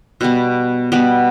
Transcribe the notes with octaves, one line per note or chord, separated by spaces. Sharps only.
B2 G3 B3
B2 G3 B3